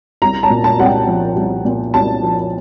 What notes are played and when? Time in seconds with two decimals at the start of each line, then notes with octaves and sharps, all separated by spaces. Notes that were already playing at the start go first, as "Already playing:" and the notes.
0.22 C2 A#5
0.43 A5
0.50 A#2
0.64 A5
0.79 C2 F#5
0.86 G5
1.07 F3
1.36 C2
1.65 A#2
1.94 C2 A5
2.22 F3